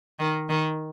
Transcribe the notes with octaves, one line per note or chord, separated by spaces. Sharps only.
D#3
D#3